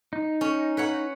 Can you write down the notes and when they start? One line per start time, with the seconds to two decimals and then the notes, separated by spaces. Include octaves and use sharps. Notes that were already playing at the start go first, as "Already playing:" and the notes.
0.13 D#4
0.41 C#4
0.77 B4 C#5 F#5